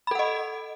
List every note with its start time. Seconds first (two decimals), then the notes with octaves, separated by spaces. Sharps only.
0.07 B5
0.11 A4
0.15 F#5
0.19 D#5